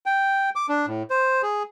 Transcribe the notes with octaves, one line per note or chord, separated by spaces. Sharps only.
G5
D6
D4
A2
C5
G#4